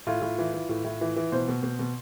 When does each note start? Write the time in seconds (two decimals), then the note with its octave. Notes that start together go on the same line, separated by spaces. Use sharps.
0.07 A2 F4
0.22 A2
0.38 E3
0.54 E3
0.69 A2
0.84 A2
1.01 E3
1.16 E3
1.32 B2 C5
1.48 B2
1.63 B2
1.79 B2